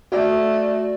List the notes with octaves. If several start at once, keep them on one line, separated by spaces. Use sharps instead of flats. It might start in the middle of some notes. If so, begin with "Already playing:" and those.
A3 F#4 D5